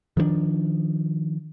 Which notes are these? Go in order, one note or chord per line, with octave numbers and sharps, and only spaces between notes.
D#3 F3 G3 D4